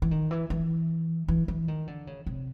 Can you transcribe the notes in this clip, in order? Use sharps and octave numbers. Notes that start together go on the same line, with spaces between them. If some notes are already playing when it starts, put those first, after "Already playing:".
E3
D#3
E3
E3
E3
E3
D#3
D3
C#3
C3